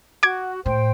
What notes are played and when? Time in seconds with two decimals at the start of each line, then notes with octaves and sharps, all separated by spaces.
0.23 F#4 D6 G#6
0.66 A2 C5 G5